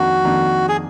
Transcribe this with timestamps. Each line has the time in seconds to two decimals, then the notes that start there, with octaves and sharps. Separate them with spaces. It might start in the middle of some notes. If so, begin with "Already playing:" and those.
Already playing: F2 D#3 A#3 D4 F#4
0.25 F2 D#3 A#3 D4
0.69 G#4